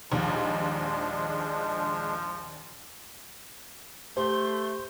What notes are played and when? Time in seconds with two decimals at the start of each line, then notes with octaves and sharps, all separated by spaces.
0.12 A#1 D#2 F3 G#3 D4
4.17 A3 G4 C5 C6